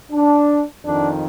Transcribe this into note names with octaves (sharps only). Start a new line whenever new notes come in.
D4
F2 D#3 D4